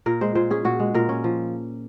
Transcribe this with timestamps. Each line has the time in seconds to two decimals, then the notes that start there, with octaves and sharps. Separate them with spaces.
0.06 A#2 A#4
0.21 G#3 C5
0.35 A#2 C5
0.51 C#4 G#4
0.65 A#2 F#4
0.80 G#3
0.94 A#2 A#4
1.09 C#4
1.24 F3